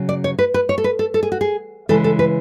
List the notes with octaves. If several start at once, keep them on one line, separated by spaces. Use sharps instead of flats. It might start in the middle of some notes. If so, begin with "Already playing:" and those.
Already playing: C#3 F#3
D5
C#5
B4
B4
C#5
A4
B4
A4
A4
G#4
F#4
G#4
C#3 E3 G#3 A4
A4
B4